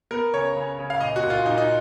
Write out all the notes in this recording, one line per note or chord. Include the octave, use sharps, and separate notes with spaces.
B3 A#4
C#3 C#5
C#3
C#3
F5
A#2 D#5
F#4
A#2
F4
A#2 D#4
D#4